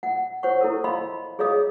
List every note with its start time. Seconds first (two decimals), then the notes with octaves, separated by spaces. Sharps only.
0.03 F#5
0.43 C5 C#5 F#5 C#6
0.61 E4 A4 A#4
0.84 D#5 F5 B5 C6
1.39 G#4 C#5 D#5 F5 D#6